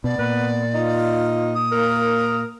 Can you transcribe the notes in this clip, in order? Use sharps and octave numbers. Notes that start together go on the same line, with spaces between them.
B2 B3 D5
A#2 B4
D#4 F4
D#6
A#3 A#4